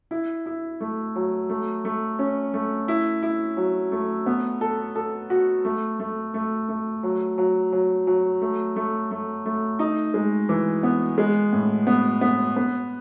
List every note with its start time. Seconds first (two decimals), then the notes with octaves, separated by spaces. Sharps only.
0.11 E4
0.46 E4
0.80 A3
1.16 F#3
1.49 A3
1.85 A3
2.19 C#4
2.54 A3
2.88 E4
3.23 E4
3.57 F#3
3.92 A3
4.26 B3
4.61 A4
4.96 A4
5.30 F#4
5.65 A3
6.00 A3
6.34 A3
6.69 A3
7.03 F#3
7.38 F#3
7.72 F#3
8.07 F#3
8.41 A3
8.76 A3
9.11 A3
9.46 A3
9.79 D#4
10.14 G#3
10.49 E3
10.83 B3
11.18 G#3
11.53 A2
11.87 B3
12.21 B3
12.56 B3